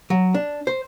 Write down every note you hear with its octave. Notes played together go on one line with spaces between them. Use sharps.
F#3
D4
C5